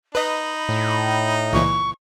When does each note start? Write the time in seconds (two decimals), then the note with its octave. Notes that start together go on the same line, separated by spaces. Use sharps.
0.15 D#4 B4 D#5 B5
0.69 A2
1.53 C#2 A#2 E3 C#6